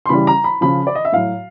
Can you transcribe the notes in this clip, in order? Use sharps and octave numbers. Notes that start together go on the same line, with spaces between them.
C6
C#3 E3 G3 B5
A#5
B5
C#3 F3 B5
D5
D#5
E5
A2 F#3 F5